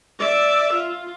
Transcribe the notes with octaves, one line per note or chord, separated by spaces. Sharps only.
D5 E5
F4